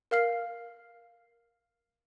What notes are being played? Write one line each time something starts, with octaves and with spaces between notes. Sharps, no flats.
A#4 F5 F6 C7